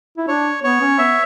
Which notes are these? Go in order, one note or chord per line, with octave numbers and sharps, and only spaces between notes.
E4
D4 C#5
B3 C#5
C#4
B3 E5